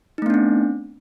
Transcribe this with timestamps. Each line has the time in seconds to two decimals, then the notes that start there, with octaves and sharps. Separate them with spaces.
0.18 D#4
0.22 A3
0.26 B3
0.30 D4
0.34 C4